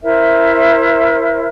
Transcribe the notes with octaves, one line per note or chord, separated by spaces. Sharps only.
E4 A#4 C5 E5